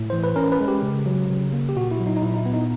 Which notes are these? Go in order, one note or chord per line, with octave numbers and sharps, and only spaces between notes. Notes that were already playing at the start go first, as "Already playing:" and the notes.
Already playing: A2
E3 C5
B4
C#4 A#4
B4
G#3
G4
C#3
F#3
C#3
A#3
G4
A#2 F#4
E4
F#3
D#4
D#4
A#2 E4
D#4
E4
B3
D#4